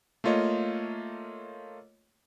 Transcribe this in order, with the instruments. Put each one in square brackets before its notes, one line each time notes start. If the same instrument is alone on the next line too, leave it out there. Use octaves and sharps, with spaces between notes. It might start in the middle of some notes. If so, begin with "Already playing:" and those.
[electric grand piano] A3 A#3 F4 C#5 D#5